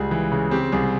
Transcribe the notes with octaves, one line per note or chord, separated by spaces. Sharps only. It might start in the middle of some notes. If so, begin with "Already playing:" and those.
Already playing: C#2 G3 G#4
E3
C#3
C4 G4
C2 G#4